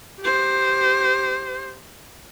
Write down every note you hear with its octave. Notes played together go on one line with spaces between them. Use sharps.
G4 C5